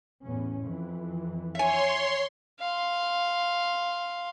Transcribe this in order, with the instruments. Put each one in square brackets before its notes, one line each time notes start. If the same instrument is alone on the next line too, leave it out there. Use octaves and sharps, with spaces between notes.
[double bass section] E2 A2 C#4
F2 E3
[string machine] C#5 C6 [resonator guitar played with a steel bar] E5 G#5
[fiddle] F5 C6